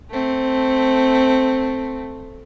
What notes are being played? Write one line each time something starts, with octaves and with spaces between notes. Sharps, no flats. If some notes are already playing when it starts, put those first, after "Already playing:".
A3 C4